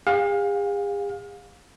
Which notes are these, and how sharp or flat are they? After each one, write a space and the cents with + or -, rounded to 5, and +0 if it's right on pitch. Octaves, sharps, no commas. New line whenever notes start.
G#4 -45 F5 +30